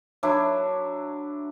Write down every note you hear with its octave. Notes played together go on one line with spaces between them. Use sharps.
F#3 D4 E4